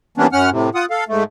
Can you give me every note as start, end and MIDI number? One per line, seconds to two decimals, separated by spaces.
0.18 0.27 52
0.18 0.27 55
0.18 0.27 58
0.18 0.27 59
0.18 0.27 61
0.18 0.27 62
0.32 0.50 42
0.32 0.50 61
0.32 0.50 78
0.32 0.50 89
0.51 0.69 45
0.51 0.69 48
0.75 0.85 65
0.75 0.85 78
0.75 0.85 87
0.91 1.04 69
0.91 1.04 77
1.08 1.24 44
1.08 1.24 57